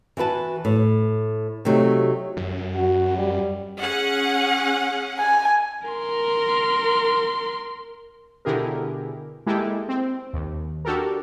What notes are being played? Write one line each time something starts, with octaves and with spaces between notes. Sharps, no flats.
E3 F#4 B4 A5
A2
C3 F#3 A3 D#4 F#4
F#2
F#4
G3
C#4 G#4 F#5
G#5
A#4 C6
B2 D3 E4 G4 G#4 A#4
G#3 A#3 E4 G4 A4
C4
D#2
D4 F#4 G4 A4 A#4